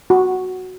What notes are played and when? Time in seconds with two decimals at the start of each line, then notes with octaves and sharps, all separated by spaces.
0.10 F#4